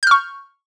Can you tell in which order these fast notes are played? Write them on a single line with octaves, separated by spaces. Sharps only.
G6 F6 C#6